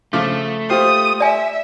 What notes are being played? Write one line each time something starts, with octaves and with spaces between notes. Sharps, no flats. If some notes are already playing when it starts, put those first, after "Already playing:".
C#3 F3 A3 D6
F4 G4 C5 D#6
D5 E5 G#5